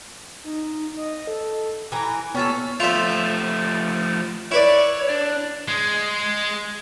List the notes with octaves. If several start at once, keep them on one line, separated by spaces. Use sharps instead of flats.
D#4
D#5
A4
E3 G#5 A#5
B3 C#4 F4 A4
F3 A3 F4 E5
E4 B4 C#5 D5
D4
G#3